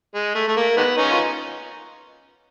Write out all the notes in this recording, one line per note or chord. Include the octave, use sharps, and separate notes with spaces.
G#3
A3
A3
A#3
D#3 G#3 B3
C#4 D#4
F4